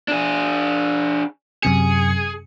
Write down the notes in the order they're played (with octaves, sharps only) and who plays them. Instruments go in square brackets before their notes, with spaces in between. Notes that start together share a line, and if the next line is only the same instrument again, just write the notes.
[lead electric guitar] D4 G#4
[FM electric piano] F#2 C3 C#7 [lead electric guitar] G#4